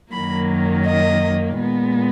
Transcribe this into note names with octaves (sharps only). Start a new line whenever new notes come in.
F#2 D#3 F#3 A#3 B5
D#5
A#2 G#3 B3